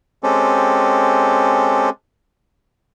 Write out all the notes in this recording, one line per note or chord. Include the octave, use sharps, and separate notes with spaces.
G#3 C4 C#4 G4 A4